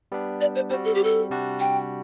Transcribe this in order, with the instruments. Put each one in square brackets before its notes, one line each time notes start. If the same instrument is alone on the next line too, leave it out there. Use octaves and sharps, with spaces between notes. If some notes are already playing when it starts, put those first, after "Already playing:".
[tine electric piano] G3 B3 D4
[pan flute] D5
C5
[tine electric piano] G3 C4 F#4 [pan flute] C5
[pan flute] A4
G4
A4
[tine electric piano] C3 G3 D4 F#4
[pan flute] G5